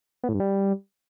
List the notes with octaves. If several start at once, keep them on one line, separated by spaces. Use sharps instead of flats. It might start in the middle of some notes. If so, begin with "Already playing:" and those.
B3
A2
G2
G3